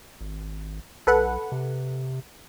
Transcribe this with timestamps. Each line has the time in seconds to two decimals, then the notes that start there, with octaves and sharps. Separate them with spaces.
0.21 G#1
1.07 B1 A4 B4 F#5
1.52 C3